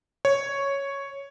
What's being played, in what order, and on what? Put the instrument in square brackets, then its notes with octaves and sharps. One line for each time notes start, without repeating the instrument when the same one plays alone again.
[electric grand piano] C#5